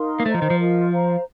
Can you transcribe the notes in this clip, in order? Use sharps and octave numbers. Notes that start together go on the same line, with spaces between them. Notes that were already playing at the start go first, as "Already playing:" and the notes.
Already playing: D#4 A#4 F5 C6
A#3
A3 C5 D#5 A#5
F3
D#3
F3
F4 A#4 D#5
C5 F5 A#5